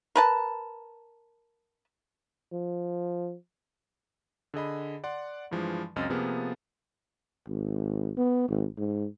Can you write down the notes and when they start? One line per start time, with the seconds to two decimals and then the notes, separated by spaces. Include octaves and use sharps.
0.16 A#4 B4 A5
2.53 F3
4.54 D3 G#4 D#5 B5
5.04 D5 F#5 C6
5.51 G2 E3 F3 G#3
5.96 C#2 F#2 C4 D#5 F6 A6
6.10 C3 F3 A#3 B3 G#4
7.48 G#1
8.17 B3
8.48 G#1
8.77 G#2